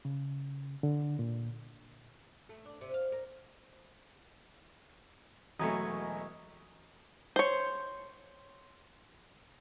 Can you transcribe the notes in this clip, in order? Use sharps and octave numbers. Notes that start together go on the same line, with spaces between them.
C#3
D3
A#2
A3
D4
C3
F5
A#4
E1 F#3 A3 D#5 G#5 C#6
C5 C#5